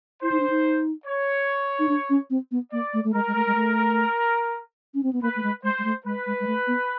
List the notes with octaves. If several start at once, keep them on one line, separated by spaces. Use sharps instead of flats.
E4 C5
D#4
D4
D#4
C#5
D#4
D4
C#4
C4
B3
A#3 D5
A3
A3
G#3 A#4
G#3
A3
G#3
A3
C#4
C4
B3
A#3 B4
A3
G#3
G#3 C5
G#3
A3
G#3 B4
G#3
G#3
A3
B3